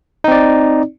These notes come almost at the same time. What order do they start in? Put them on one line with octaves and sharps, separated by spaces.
D#4 C4 D5